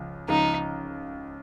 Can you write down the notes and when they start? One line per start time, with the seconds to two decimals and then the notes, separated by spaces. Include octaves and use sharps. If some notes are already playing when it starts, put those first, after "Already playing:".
Already playing: C#2 C#3 F3
0.28 C#2 C#3 F3 D#4